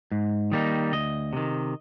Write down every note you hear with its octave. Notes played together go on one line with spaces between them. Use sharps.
G#2
D#3 G3 A#3 D#4
D2 D#5
C3 D#3